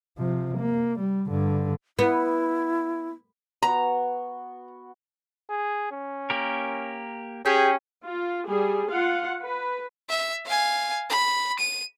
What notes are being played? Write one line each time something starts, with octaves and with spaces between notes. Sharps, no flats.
C3 F3
A#3
G3
G2 D3
B3 E4
B3 F#4 A#5
G#4
C#4
A#3 G4 A#4
C#4 G4 G#4
F4
G3 G#4
F4 F5 F#5
B4
E5
F5 G#5
B5
D#7